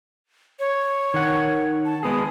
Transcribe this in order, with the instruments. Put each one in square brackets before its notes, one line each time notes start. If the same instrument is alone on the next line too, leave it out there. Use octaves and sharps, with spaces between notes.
[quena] C#5
[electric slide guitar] D#3 F#5
[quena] A5
[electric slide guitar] G#3 B3 G#4 [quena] D#6